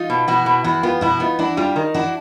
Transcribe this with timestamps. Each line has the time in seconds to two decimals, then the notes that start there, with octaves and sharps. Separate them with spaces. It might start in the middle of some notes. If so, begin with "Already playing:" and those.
Already playing: D#4 F4
0.10 B2
0.28 B2 E4 F#4
0.46 B2
0.64 E2 E4 F#4
0.83 B3 F4 G4
1.01 B2 E4 F#4
1.20 B3 D#4 F4
1.39 D4 E4 F#4
1.57 G3 F4 G4
1.76 D#3
1.94 D4 E4 F#4